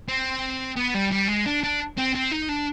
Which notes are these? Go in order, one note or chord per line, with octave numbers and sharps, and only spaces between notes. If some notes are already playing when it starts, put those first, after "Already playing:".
C4
B3
G3
G3
G#3
D4
D4
C4
C4
D#4
D4